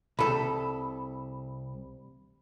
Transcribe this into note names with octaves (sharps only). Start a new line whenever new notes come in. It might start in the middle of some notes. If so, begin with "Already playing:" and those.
C2 A4 B5